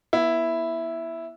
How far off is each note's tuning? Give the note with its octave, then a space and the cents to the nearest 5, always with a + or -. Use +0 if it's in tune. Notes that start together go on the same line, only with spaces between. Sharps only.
B3 -40 E4 +0